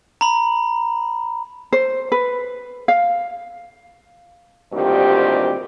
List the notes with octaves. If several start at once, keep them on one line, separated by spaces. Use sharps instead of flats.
A#5 B5
C5
B4
F5
D2 G2 A#2 D#3 C4 G4